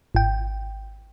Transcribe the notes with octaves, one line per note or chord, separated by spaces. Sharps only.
G#1 G5